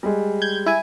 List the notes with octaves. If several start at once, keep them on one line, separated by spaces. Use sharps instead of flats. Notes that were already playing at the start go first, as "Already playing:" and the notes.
G3 G#3
G6 G#6
E4 G#5